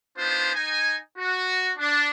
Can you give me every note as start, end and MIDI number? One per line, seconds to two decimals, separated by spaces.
0.17 0.54 59
0.17 0.54 62
0.17 0.54 63
0.17 0.54 65
0.17 0.54 72
0.55 0.96 63
0.55 0.96 80
1.18 1.71 66
1.78 2.11 62